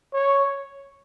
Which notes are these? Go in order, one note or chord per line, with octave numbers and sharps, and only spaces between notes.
C#5